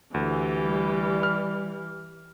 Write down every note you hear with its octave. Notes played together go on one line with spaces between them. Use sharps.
D2 E3 G4
G3
F6